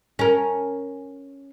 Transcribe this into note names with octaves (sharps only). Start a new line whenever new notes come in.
C#4 A#4